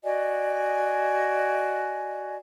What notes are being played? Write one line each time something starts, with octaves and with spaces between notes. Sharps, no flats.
F#4 D5 D#5 G#5